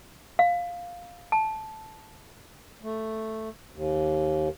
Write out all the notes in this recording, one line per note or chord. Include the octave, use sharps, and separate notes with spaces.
F5
A5
A3
D#2